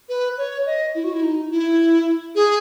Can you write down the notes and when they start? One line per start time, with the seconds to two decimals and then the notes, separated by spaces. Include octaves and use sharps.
0.09 B4
0.38 C#5
0.66 D#5
0.95 E4
1.04 F#4
1.13 E4
1.22 D#4
1.51 E4
2.35 G#4